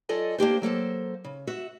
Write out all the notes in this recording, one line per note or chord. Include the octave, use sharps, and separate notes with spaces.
F#3 F4 A4 D5 D#5 G#5
A#3 D4 G4 C5
F#3 A#3 A4 C5
C#3
F#4 E5